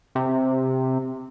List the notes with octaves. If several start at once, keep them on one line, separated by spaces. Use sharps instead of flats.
C3